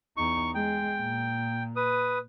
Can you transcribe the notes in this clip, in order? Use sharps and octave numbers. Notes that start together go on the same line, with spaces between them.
E2 D#4 C#6
G#3 G5
A#2
B4 D#6